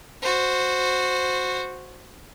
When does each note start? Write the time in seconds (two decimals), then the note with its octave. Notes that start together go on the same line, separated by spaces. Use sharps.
0.22 F#4 C5